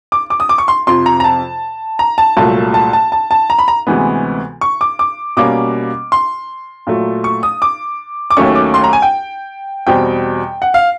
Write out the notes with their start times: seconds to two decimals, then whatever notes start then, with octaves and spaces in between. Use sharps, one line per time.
0.12 D6
0.30 D6
0.40 D#6
0.49 D6
0.58 C#6
0.68 C6
0.87 F2 C3 F3 C6
1.06 A#5
1.20 A#5
1.24 A5
1.99 A#5
2.18 A5
2.37 C2 A#2 F#3 A3 A5
2.74 A5
2.93 A5
3.12 A5
3.31 A5
3.50 A#5
3.59 B5
3.68 A#5
3.87 D2 C3 E3 G#3 B3
4.61 C#6
4.81 D6
4.99 D6
5.37 B2 G3 A#3 C#4 D6
6.12 C6
6.87 A#2 F#3 A3
7.24 C#6
7.43 D#6
7.62 D6
8.30 D6
8.37 D#2 D#3 F#3 A3 C#4 C#6
8.55 D6
8.74 C6
8.84 A#5
8.93 G#5
9.02 G5
9.87 E2 B2 G3 C4 G5
10.62 F#5
10.74 F5